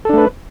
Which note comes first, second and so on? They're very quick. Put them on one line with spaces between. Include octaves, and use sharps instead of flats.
A4 D4 A3 B4